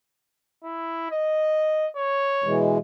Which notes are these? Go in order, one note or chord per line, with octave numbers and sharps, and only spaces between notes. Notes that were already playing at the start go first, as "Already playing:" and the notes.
E4
D#5
C#5
B2 E3 G#3